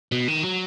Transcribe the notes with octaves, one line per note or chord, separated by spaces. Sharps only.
B2
D#3
F#3